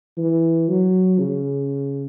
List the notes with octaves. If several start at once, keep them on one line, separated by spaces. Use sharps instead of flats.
E3
F#3
C#3